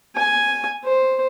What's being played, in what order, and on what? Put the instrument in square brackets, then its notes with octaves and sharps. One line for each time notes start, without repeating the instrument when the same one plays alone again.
[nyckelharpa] G#5
C5